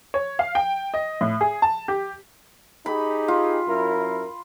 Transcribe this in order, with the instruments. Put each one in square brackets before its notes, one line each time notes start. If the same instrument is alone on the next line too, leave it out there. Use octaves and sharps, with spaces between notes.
[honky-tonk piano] C#5
F5
G5
D#5
A2
G#4
A5
G4
[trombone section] D#4 G4 G#4 [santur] B5
[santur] F4
[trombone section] F#2 E4 A#4